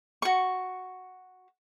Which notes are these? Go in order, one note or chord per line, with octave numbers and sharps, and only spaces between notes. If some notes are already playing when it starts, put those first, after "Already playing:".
F#4 C#6